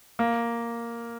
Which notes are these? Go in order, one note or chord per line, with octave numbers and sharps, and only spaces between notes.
A#3